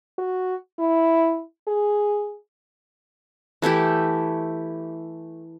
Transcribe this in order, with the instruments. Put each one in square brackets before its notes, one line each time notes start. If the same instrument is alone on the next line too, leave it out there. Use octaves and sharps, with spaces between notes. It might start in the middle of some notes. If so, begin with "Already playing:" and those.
[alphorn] F#4
E4
G#4
[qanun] E3 A3 E4 G4